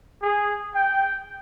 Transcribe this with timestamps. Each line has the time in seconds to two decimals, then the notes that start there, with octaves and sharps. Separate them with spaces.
0.22 G#4
0.73 G5